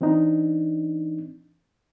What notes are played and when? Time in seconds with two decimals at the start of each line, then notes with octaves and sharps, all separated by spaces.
0.01 E3 C4 D4 D#4